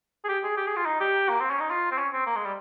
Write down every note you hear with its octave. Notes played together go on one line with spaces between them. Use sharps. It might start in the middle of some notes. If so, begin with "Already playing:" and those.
G#4
G4
G#4
G4
G#4
F4
D#4
G4
A#3
C4
C#4
D#4
F4
C4
C#4
C4
A#3
G#3
G3